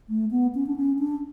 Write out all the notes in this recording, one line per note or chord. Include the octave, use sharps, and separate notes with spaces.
A3
B3
C#4
D4
C#4
D4